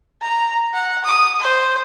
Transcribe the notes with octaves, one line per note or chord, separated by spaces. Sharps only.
A#5
F#5
D#6
C5